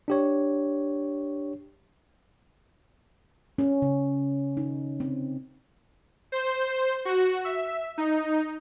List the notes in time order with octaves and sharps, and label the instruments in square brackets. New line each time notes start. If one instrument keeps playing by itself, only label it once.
[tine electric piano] D4 G4 C#5
[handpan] C#4
C#3
D#4
C4
[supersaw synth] C5
F#4
E5
D#4